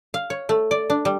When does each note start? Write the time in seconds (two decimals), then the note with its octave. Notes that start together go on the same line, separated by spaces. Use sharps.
0.14 F5
0.30 C#5
0.49 A3
0.71 D5
0.90 D4
1.05 G3